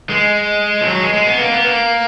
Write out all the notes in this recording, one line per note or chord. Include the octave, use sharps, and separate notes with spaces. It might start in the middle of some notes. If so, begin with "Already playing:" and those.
G#3
F3
F#3
G#3
G#3
B3
A#3
B3
A#3